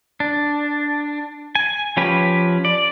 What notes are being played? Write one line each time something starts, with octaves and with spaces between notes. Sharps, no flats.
D4
G#5
F3 C#4 G4 B4
D5